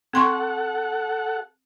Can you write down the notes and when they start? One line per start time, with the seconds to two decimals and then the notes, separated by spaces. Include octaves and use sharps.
0.13 C4 A4 F#5 C6 C#6